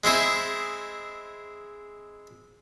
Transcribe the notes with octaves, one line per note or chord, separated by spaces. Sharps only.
G#3 C4 E4 G#4